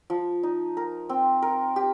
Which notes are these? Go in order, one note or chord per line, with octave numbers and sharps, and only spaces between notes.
F3
D#4
A#4
C4
A#4
G4